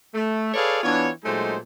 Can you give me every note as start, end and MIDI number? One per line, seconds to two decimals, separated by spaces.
0.14 0.53 57
0.54 0.79 68
0.54 0.79 69
0.54 0.79 71
0.54 0.79 73
0.54 0.79 74
0.54 0.79 77
0.83 1.09 52
0.83 1.09 59
0.83 1.09 62
0.83 1.09 65
0.83 1.09 73
1.24 1.57 46
1.24 1.57 54
1.24 1.57 56
1.24 1.57 57
1.24 1.57 63
1.24 1.57 72